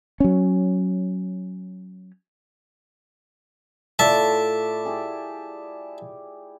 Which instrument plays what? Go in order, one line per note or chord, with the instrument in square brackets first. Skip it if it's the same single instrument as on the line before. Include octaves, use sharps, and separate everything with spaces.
[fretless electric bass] F#3 C#4
[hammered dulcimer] A2 F4 D5 [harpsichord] E5 A5
[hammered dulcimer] E4 G4 G#4